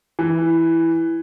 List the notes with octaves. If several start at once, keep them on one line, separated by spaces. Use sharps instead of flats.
E3